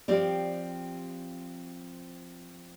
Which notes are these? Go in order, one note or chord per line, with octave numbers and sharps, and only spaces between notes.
F3 C4 G4 D5